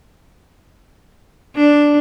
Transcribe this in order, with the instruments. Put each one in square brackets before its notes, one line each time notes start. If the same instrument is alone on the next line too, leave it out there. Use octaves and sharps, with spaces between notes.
[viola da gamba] D4